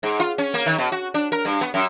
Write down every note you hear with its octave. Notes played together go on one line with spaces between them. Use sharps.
G#2
F4
C#4
A#3
D#3
B2
F#4
D4
A#4
G2
B3
F#2